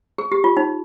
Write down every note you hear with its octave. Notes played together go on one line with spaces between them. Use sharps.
G#4
G4
F4
D#4